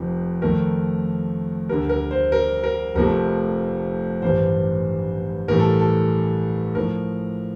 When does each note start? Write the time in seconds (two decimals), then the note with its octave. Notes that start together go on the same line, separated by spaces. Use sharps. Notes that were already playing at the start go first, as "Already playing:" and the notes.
Already playing: F1 F2 C3 F3
0.42 F2 D#3 A3 A#4
1.69 D2 D3 G3 A#4
1.89 A#4
2.11 C5
2.32 A#4
2.64 A#4
2.95 F1 F2 C3 F3 A3 A#4
4.22 A1 G2 D#3 G3 C5
5.48 A1 A2 G3 A#4
5.60 A4
5.80 A4
6.75 A2 F3 A#4